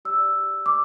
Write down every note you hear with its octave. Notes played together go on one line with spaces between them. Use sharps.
G4 D5 E6
D6